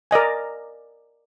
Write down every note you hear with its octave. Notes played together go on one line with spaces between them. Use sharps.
A#4 D5 D#5 G#5